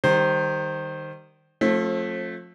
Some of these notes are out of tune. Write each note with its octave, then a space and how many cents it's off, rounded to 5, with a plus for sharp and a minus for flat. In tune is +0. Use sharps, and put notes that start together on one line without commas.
D#3 -15 G3 +0 C5 +5
F3 +25 A3 -5 C4 +40